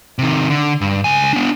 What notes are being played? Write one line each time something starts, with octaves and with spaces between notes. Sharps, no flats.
C3 D#3
D3
G2
C#2 G#5
B3 D4